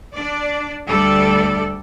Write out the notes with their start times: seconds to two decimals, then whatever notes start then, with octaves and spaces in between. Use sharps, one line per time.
0.14 D4 D5
0.87 D2 G3 A4 D5